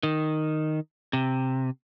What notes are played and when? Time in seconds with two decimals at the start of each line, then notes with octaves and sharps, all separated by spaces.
0.03 D#3
1.13 C3